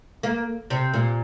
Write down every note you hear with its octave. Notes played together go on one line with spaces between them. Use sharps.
A#3
C3
A#2